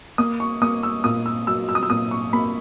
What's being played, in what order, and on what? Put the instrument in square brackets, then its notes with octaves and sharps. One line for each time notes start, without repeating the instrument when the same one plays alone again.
[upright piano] A#3 D#6
C#6
A#3 D#6
E6
A#2 D#6
E6
F#3 E6
E6
D#6
E6
A#2 D#6
C#6
A#3 B5